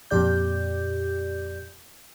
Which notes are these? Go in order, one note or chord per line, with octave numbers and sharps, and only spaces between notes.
F2 A#2 G4 D5 G6